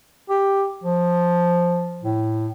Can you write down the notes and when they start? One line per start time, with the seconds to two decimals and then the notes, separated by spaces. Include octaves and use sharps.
0.29 G4
0.83 F3
2.03 A2